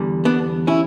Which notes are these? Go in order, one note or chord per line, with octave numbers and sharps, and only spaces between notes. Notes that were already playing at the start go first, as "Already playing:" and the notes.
Already playing: E2 D3 G3
B3 D4
C#4 E4